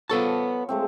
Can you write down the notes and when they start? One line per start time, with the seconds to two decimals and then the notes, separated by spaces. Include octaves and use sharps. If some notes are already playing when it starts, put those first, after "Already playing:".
0.10 F3 B3 A4 C#5 A5
0.69 G#3 A3 C4